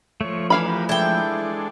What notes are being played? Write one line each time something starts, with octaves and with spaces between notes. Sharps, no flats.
F3 A3 C#5
E3 D4 F5 B5
G4 A#4 B4
G#3 D4 E4 A4 G5